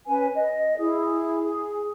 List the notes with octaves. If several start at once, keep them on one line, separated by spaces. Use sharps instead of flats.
C#4 B4 G#5
D#5
E4 G#4
G#4